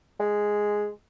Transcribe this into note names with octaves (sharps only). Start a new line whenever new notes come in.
G#3